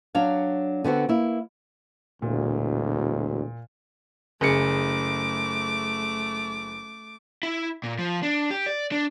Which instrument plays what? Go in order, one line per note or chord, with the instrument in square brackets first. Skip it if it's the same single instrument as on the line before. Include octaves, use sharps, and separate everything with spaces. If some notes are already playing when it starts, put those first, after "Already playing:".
[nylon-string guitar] F#3 D4 C#5 F5
D3 B3 C4 F#4
A#3 E4
[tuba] E1 [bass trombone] D2 [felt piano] A#2
[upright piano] F#1 G#4 C#7 [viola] A3 D6
[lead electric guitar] E4
A#2
F3
D4
G4
D5
D4